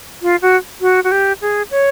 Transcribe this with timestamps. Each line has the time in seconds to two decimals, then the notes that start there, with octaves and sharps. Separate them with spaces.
0.22 F4
0.42 F#4
0.81 F#4
1.04 F#4
1.11 G4
1.41 G#4
1.71 C#5